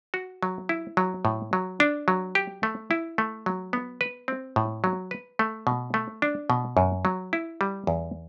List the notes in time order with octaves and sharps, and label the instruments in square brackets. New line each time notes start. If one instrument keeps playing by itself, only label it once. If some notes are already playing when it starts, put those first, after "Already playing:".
[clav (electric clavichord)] F#4
F#3
E4
F#3
A2
F#3
D4
F#3
G4
A3
E4
A3
F#3
B3
B4
C4
A2
F#3
B4
A3
B2
A3
D4
B2
F#2
F#3
E4
G3
E2